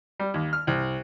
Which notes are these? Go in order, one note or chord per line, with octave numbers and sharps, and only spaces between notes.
G3
D#2
F6
C2